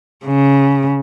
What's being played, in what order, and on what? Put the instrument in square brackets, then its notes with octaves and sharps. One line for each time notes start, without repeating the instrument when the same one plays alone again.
[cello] C#3